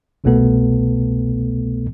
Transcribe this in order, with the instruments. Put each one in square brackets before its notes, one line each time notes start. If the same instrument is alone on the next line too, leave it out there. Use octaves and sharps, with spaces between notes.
[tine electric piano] G1 C2 B2 A3 B3 A4